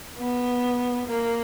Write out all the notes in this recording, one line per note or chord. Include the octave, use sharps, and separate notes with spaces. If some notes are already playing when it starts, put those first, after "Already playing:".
B3
A#3